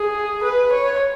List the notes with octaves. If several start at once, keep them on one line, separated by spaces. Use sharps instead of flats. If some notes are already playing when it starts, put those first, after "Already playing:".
Already playing: G#4
B4
C#5